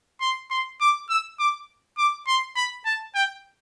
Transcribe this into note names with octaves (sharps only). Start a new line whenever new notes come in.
C6
C6
D6
E6
D6
D6
C6
B5
A5
G5